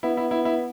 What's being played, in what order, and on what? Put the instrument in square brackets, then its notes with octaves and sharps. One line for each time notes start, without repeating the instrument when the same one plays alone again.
[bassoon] B3 [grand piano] E4
[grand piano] E4
E4
E4